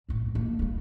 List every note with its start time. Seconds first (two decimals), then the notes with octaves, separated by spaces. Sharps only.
0.09 F1 A2
0.35 A#3
0.59 G3 A#3